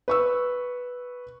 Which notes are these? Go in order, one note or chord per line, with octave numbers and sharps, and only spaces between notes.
B4 C#6 E6